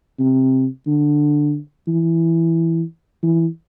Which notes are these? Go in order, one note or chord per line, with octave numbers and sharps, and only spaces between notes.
C3
D3
E3
E3